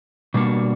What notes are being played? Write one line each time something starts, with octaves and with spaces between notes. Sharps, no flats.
B2 G3 A#3 D4 F#4